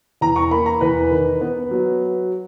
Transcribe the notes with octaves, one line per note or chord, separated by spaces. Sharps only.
E2 A#5
C#6
A#3 B5
A#5
E2 B4
D#3
B3
F#3